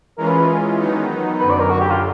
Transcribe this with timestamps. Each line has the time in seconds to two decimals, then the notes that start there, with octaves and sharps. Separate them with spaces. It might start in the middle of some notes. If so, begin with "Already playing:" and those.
0.17 E3 G#3 C#4 F4 A#4
0.27 B4
0.39 B4
0.79 D#3 F#3 B3 D#4
1.39 F#2 D3 F#3 B4
1.50 D5
1.60 A#4
1.70 F#4
1.80 G4
1.90 F4